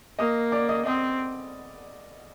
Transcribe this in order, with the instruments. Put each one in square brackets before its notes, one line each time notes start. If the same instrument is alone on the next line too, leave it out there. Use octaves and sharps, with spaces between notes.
[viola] A#3 [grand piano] D#5 D#6
[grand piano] D5 D6
D#5 D#6
[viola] C4 [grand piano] D#5 D#6